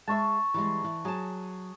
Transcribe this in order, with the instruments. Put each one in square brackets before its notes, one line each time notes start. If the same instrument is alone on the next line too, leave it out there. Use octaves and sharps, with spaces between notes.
[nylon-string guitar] G#3 E5 [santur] A5 C#6
[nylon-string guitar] E3 G3 G#3
E3
[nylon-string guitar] F#3 A5 [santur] G#4